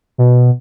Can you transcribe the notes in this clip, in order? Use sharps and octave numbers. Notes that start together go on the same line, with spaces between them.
B2